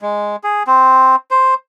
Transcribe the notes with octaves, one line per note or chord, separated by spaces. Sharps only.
G#3
G#4
C4
C5